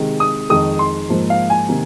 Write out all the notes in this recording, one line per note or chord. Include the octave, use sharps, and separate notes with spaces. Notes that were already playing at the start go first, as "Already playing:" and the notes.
Already playing: C3 D#3 G#3
D#6
F2 D#3 G#3 D#6
C6
G#2 F3 A#3
F5
G#5
C3 D#3 A#3